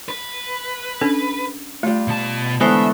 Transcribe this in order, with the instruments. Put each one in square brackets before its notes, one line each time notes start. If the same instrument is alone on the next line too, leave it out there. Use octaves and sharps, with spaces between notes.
[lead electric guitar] B4
[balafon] C#4 D4 A4
[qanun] G3 F4 [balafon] A3
[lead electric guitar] B2 A5
[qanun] D3 E3 A3 [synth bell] G#3 B3 C5 [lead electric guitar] E5